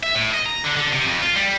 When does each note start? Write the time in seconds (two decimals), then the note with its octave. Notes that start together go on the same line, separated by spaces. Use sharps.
0.03 E5
0.15 A2
0.34 D#5
0.46 A#5
0.64 D3
0.76 D3
0.93 C3
1.05 F2
1.22 F4
1.36 G3